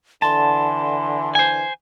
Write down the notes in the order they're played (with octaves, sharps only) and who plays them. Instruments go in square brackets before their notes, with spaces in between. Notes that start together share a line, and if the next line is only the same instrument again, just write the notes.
[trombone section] D3 E3 [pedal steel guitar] A5 [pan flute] C6
[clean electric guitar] C5 G#5